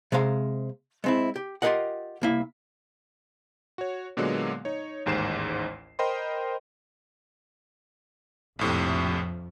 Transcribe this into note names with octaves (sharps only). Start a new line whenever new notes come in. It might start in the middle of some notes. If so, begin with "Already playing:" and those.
C3 G#3 C5 F5 A#5
G#3 C4 E4
G4
F4 G4 G#4 A#4 D#5 F#5
C2 A#3 E4
F#4 C#5
A#2 D3 F#3 G#3 A#3 B3
D#4 C#5
A1 D#2 G#2 C5 C7 E7
A#4 C5 D#5 G5 B5 C6
A#1 F2 A2 C3 F3